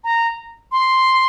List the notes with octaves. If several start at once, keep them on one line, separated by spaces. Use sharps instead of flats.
A#5
C6